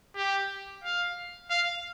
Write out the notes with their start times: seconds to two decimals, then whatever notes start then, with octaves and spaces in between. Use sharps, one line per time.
0.16 G4
0.84 F5
1.50 F5